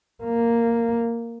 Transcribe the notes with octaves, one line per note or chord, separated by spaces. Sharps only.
A#3